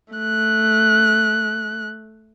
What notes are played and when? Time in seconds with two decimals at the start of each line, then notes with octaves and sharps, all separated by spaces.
0.14 A3 F#6